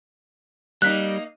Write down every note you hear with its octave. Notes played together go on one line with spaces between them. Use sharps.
G3 A#3 D#4 F#6 B6